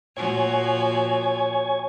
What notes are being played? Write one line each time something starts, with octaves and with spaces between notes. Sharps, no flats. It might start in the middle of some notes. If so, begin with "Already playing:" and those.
A#2 F3 F#4 C#5 G#5